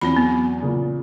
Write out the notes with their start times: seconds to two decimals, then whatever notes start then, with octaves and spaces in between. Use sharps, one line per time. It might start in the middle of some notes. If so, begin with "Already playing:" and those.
0.01 E2 F#3 C4 B5 G7
0.17 B3
0.62 A#2 C#3